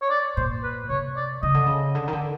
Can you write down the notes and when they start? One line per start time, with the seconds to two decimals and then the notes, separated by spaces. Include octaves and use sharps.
0.02 C#5
0.10 D5
0.36 A#2 C5
0.63 B4
0.89 C3 C#5
1.16 D5
1.43 C#3 D#5
1.54 D3
1.66 C#3
1.95 D3
2.08 D#3
2.13 D3